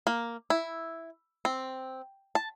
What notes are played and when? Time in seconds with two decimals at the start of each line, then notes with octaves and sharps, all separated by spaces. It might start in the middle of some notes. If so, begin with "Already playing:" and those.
0.07 A#3
0.50 E4
1.45 C4
2.35 A5